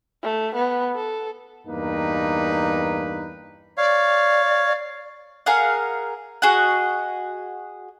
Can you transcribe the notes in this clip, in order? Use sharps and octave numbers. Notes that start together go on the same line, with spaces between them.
A3
B3
A4
E2 G2 A#3 D#4 B4
C#5 D5 F5
G#4 A#4 F5 F#5
F#4 G#4 D#5 F#5